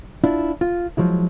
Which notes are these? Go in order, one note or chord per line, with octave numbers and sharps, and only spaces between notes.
D4 E4 F4
F4
F3 F#3 G#3 E4